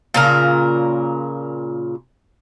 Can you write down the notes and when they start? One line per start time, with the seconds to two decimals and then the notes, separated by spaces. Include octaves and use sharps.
0.14 A#2 C#3 A#4